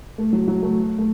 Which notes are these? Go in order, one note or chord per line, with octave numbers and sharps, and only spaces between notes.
A3
F#3
F#3
A3
A3